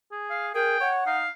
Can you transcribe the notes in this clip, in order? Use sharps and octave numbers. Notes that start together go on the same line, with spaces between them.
G#4
F5
G#4 A#4 G5
C#5 F#5
D#4 F5